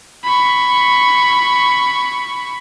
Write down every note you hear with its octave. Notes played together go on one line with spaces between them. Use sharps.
B5 C#6